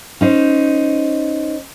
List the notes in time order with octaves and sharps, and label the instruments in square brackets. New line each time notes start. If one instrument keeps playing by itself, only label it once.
[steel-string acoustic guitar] C#4 D#4 C5